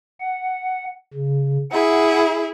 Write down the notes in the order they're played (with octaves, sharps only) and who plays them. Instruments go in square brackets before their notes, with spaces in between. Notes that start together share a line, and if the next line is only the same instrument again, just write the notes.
[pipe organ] F#5
C#3
[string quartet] E4 G#4 [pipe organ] F#5